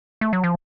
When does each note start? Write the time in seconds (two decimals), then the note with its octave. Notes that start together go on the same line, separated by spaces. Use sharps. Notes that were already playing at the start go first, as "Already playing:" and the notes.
0.21 A3
0.33 F#3
0.44 F3